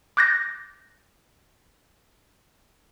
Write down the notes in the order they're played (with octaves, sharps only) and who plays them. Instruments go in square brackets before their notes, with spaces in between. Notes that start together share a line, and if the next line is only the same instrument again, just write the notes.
[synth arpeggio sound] D6 F#6 G6 A6 A#6